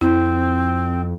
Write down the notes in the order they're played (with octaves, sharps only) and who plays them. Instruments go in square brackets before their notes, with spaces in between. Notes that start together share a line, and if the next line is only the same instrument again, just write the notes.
[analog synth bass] F2 [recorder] C4 [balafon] E4